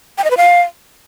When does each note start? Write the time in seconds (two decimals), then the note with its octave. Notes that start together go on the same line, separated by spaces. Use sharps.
0.18 G5
0.24 D#5
0.31 B4
0.37 F5